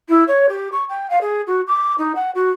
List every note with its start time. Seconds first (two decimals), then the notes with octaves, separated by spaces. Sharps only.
0.09 E4
0.28 C#5
0.49 G4
0.72 C#6
0.89 G5
1.10 F5
1.21 G#4
1.47 F#4
1.68 D6
1.98 D#4
2.16 F#5
2.35 F#4